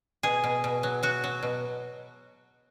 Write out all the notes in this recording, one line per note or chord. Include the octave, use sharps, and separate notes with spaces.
B2 G#4
B2
B2
F#3
F#3 F#4
F#3
B2